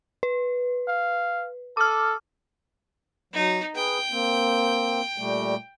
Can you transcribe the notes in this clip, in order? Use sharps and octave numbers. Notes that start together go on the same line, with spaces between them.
B4
F5
A4 D6 F6
F#3 D#4
G#4 B4 G5
A#3 C4
A#2 G3 A3